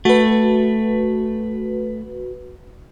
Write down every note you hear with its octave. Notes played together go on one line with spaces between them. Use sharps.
A3 F#4 B4